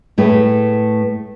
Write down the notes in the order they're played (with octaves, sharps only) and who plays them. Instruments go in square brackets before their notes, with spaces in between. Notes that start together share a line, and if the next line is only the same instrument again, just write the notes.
[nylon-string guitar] A2 A3 G#4 B4